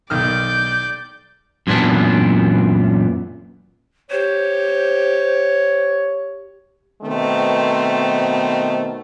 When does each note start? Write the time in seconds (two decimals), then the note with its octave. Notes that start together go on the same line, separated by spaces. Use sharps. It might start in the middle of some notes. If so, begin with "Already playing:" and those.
0.10 B1 D#3 D5 F6 G6
1.67 F#2 A#2 E3 B3 D4
4.11 G4 C5 C#5
7.03 B2 D#3 A3 B3 C4